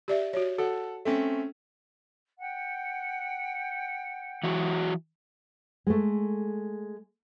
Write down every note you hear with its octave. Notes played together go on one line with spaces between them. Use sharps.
G4 D5 E5
F#4 C#5
F#4 A4 F#5
A3 C4 C#4
F#5 G5
E3 F#3 F#4
G#3 A3